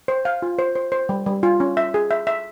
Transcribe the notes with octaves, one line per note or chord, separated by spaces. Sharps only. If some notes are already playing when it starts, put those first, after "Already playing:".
C5
F5
F4
C5
C5
C5
G3
G3
F4
C#4
E5
G#4
E5
E5